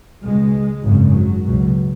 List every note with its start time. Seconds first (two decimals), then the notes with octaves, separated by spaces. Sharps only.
0.23 C#2 B2 G#3
0.84 G#1 F#2 C#3
1.14 F#3
1.45 C#2 B2